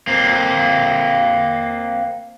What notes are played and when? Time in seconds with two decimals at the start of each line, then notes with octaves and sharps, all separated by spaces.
0.07 A#3 C4